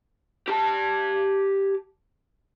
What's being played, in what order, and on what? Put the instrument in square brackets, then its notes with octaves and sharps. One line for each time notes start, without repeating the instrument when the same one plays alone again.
[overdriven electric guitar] G4 A5